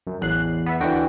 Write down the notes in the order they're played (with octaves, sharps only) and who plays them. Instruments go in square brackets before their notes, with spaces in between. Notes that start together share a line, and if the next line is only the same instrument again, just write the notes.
[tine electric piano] F#2
[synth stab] A1 F#6 C7 [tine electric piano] E2
[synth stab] B3 E5
[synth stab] D#2 F#4 G5 [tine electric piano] D3 E3